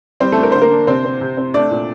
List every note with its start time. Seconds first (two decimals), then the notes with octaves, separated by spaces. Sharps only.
0.20 G3 C4 C5
0.32 A3 A4
0.37 D4
0.43 A#4
0.52 D3 C5
0.61 A#3 A#4
0.71 D4
0.87 C3 C4 C5
1.05 C4
1.21 C3
1.37 C4
1.54 A3 D4 D5
1.71 A#2